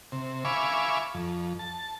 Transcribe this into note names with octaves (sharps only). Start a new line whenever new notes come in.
C3
E5 F5 G#5 B5 C#6 D6
F2
A5